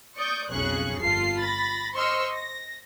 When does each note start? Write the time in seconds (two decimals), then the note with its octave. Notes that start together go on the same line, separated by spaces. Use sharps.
0.16 D5 C#6 D#6 G6
0.50 B1 F2 C#3 G#4 C#6 F#6
0.99 G1 F4 A4 C7
1.39 B5 A6 A#6
1.94 C5 D#5 C6 C#6 E6 F6
2.30 A#6